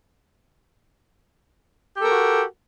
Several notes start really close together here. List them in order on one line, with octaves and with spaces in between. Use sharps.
G4 A4 A#4 F#4